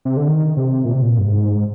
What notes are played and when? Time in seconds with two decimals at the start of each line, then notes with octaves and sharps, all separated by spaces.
0.05 C3
0.17 D3
0.28 D#3
0.57 C3
0.85 A#2
0.93 C3
1.02 A#2
1.19 G2
1.26 G#2